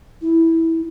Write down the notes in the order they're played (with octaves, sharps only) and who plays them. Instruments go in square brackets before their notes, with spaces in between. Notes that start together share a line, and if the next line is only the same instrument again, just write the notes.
[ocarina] E4